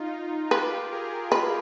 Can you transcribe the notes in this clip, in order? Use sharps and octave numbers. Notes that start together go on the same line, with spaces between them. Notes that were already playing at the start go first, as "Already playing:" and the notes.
Already playing: D#4 F4
F4 G4 B4
G#4 A#4
B4